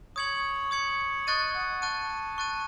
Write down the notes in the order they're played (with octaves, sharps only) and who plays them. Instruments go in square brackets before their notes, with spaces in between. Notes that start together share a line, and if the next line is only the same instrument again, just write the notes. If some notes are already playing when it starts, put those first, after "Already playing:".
[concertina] C#5 [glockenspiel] D#6 G#6 C#7 F#7
[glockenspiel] D#6 G#6 C#7 F#7
[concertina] D#5 [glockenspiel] C#6 F#6 A6 D#7
[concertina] F#5
[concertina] A5 [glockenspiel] C#6 F#6 A6 D#7
[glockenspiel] C#6 F#6 A6 D#7